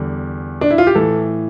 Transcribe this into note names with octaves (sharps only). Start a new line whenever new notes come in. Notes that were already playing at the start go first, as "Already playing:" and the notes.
Already playing: E2 D3 G3
D4
E4
F4
G4
A2 E3 A4